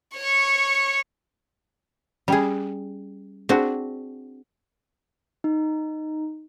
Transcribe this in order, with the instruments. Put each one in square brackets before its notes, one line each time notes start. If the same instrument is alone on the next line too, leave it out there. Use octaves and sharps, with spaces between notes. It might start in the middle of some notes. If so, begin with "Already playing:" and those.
[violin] C#5 C#6
[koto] G3 G#4 [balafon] C#4 G5
[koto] C4 D4 F#4 [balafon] G#4
[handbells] D#4